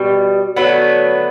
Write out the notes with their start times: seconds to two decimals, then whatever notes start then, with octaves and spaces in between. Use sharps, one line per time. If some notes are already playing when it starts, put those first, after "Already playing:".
Already playing: B2 G3 G4
0.56 D3 F#3 A3 B3